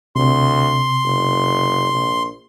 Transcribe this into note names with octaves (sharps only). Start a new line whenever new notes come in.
D2 C3 C6
F#1
A#1